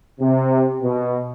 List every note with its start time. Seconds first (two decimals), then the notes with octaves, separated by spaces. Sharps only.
0.20 C3
0.82 B2